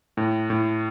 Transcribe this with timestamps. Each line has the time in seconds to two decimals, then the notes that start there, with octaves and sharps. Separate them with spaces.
0.17 A2
0.50 A2